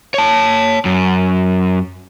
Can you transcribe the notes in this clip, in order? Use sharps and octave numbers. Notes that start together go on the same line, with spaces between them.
C#5 A5
F#2